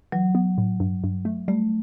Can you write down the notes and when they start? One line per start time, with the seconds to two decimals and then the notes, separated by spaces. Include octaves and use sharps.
0.12 E3 F#3
0.35 B3
0.58 A2
0.80 G2
1.04 G2
1.25 A3
1.48 G3 A3